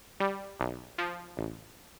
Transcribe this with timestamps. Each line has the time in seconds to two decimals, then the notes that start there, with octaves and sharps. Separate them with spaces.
0.20 G3
0.60 B1
0.98 F3
1.37 A1